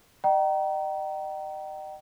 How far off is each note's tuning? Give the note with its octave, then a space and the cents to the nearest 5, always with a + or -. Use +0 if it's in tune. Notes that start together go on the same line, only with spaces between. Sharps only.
D#5 -35 G5 -35 A#5 +20